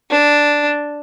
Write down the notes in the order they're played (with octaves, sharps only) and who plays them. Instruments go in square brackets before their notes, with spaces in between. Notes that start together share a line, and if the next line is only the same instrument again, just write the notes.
[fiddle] D4